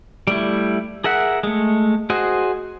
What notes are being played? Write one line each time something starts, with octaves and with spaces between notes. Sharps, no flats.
G3 A3 E4
G#4 A#4 E5 F#5
G#3 A3
F#4 G#4 C5 D#5